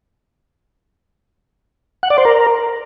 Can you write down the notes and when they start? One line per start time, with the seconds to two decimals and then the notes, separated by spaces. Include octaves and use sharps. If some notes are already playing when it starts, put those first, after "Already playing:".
2.03 F#5
2.10 D5
2.18 C5
2.25 A#4